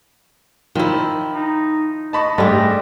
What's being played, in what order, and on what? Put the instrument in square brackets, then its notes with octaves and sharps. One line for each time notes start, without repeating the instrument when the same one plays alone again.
[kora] D#3 E4 [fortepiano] F3
[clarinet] D#4
[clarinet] D#5 [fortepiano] A5 B5 C#6
[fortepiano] G#2 A3 [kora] G3 D4